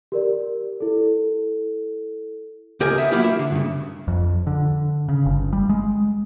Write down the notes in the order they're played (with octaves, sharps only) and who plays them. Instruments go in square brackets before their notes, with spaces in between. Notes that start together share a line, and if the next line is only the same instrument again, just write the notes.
[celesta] G4 A#4 D5
E4 A4
[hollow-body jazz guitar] C#2 G4 A#4 D#5 G#5
B3 E5
F#3 A3 A#3 E4 F4 G4
E5
D3
G2 C#3
[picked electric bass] F2
D3
C#3
G1
G3
G#3